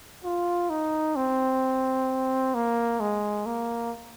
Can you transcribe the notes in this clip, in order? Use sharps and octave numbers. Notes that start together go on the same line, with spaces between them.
F4
D#4
C4
A#3
G#3
A#3